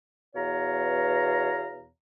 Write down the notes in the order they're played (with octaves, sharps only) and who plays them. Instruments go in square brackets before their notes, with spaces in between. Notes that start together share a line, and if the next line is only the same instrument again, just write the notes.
[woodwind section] E2 B2 C#5 F5 A#5